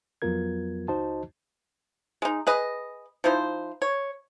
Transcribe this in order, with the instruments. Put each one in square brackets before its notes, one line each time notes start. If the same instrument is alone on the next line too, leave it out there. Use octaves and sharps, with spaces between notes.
[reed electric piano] F2 F#3 B3 F4 A#4 G#6
C#2 D#4 F#4 C5 D#5 A5
[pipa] G#3 D#4
G#4 B4 D#5
F3 D#4 E4 C5
C#5